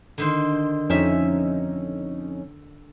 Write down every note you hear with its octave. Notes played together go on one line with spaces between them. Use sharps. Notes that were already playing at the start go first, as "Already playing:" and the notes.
D3 D#3 C5
F2 C#4 D#4 E5 G5